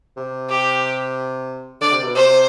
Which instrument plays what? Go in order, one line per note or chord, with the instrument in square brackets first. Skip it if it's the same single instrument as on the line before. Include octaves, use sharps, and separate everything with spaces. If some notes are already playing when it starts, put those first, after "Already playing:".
[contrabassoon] C3
[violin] G4
[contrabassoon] D3 [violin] D5
[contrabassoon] C3
B2
[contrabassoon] C3 [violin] C5